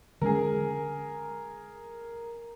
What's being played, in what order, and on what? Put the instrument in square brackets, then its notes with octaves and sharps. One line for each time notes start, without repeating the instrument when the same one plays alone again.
[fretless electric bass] D3 G#3 C#4 [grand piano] G#4 A#4